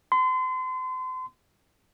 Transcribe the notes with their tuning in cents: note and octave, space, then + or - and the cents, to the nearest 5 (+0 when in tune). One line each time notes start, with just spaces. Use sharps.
C6 -35